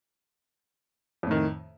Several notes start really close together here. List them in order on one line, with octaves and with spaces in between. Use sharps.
F2 A2 D#3